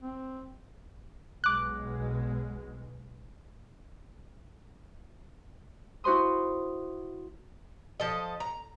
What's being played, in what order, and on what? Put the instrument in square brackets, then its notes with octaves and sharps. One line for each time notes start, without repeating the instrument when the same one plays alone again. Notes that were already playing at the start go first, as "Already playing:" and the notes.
[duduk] C4
[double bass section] B1 B2 G#3 [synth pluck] D6 F#6
[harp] E4 F#4 C5 C6 D#6
[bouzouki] F3 A4 D#5
A#5